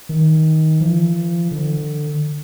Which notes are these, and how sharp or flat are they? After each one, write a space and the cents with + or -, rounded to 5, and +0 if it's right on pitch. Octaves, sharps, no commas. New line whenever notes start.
D#3 +15
F3 -35
D3 +20